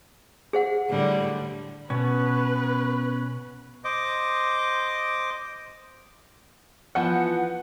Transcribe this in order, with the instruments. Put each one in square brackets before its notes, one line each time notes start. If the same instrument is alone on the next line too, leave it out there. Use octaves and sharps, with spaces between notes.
[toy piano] G#4 C5 F#5
[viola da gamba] A2 D3 G3
[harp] B2 [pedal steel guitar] B3 C#4 [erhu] B4
[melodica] C5 D#5 D6
[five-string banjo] E3 F3 B3 [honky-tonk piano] F#5